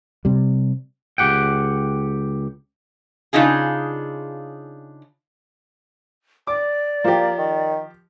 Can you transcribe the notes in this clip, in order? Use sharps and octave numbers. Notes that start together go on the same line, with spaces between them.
C3 G3
C#2 C#3 G4 F#5 G5
C#3 D4 D#4 F4 G#4
D5 D6
F3 A#3 G4
D#3